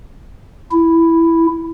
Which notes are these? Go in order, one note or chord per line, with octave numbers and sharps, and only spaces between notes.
E4